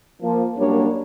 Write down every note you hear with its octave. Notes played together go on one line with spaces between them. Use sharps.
F3 A#3
F#2 G3 A#3 D4 C#5